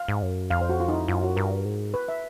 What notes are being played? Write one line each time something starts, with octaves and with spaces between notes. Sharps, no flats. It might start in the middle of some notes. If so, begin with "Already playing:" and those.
Already playing: F5
G#2
F#2
F2 F5
C5
F#4
F4
D#4
E4
F#2 F4
F#4
G2 A#4
G#2
B4
E5